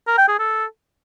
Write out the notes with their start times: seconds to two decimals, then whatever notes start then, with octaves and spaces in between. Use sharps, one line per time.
0.07 A#4
0.18 G5
0.28 G#4
0.39 A4